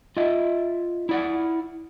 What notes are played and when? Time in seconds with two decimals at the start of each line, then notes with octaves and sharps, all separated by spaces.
0.17 F4 D#5 E5
1.09 E4 D5 F#5